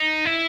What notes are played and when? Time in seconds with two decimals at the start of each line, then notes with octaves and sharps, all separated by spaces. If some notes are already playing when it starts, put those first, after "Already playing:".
Already playing: D#4
0.25 E4